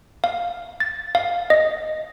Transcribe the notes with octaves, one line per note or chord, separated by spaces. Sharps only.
F5
A6
F5
D#5